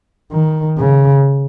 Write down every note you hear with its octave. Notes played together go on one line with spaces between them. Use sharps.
D#3
C#3